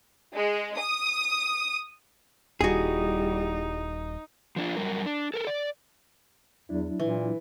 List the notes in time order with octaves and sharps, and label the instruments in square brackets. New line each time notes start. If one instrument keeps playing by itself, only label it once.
[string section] G#3
D#6
[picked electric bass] D#1 [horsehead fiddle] G3 E4 [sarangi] D#4 [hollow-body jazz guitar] F#4 G#4
[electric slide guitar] F3 D4 F4
F#2 G3 A#4
D4
A4 A#4
D5
[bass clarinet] E2 [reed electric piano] F#3 D4 E4
[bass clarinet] A#2 [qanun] E3